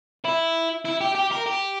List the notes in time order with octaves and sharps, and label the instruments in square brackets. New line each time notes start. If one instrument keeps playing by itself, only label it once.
[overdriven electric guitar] E4
E4
G4
G4
A#4
G4